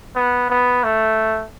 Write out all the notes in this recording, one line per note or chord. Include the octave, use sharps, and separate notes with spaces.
B3
B3
A3